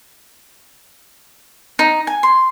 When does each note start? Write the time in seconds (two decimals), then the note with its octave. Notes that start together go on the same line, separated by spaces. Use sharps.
1.79 D#4
2.07 G#5
2.23 C6